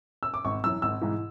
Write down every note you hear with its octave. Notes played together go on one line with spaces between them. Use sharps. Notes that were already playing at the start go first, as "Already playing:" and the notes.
E6
D6
G#1 C#6
F#2 E3 E6
G#1 E6
G#2 E3